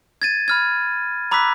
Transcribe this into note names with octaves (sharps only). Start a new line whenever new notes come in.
G#6 A6 D#7
B5 F6 G#6
A#5 B5 D6 E6 F#6 B6